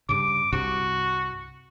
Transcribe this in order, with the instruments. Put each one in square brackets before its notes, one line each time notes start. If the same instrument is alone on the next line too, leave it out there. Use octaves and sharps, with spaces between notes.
[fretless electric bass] G2 C#3 [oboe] D6
[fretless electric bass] C2 G2 C3 [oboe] F#4